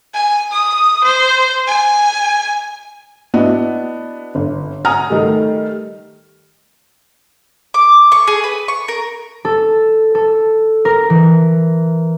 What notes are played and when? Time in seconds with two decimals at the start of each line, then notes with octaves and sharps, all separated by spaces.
0.14 G#5
0.52 D#6
1.04 C5
1.68 G#5
3.34 B3 D4 E4 F#4 D#5
4.35 G1
4.85 F#5 G#5 A#5 D#6 F6
5.10 D#3 G3 A3
7.74 D6
8.12 C#6
8.28 G#4
8.44 B4
8.68 C#6
8.88 A#4
9.45 A4
10.15 A4
10.85 A#4
11.10 E3